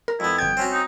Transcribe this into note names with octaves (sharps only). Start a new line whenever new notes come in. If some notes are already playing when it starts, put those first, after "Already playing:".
A#4
F2 B3 E4
G1 G5 G#6
C4 C#4 F#4
D#4